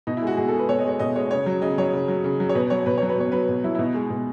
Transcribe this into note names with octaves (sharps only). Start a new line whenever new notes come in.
B2 D#4
E4
G#3 F#4
B2 G#4
A4
G#3
B4
B2 C#5
D#5
G#3 C#5
B2 D#5
G#3 C#5
C#3 C#5
F#3
C#3 D#5
F#3 C#5
C#3
F#3
C#3
F#3
C#5
B2 B4
F#3 C#5
B2 B4
F#3 C#5
B4
B2 C#5
F#3 B4
B2
F#3 E4
E4
B2 D#4
G#3
B2